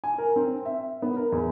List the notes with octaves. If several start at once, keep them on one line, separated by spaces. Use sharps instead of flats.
G#5
A#4
C4
E5
B3
A#4
E2